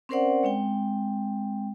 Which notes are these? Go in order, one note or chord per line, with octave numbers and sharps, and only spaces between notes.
C4 C#4 A#4 C5 D5 F#5
G#3 C4 G5